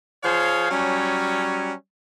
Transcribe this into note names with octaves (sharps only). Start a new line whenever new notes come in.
F3 G#4 C5 C#5 F5
F#3 G3 C#4